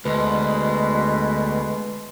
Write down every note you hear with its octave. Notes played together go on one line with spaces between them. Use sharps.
D2 B2 G#3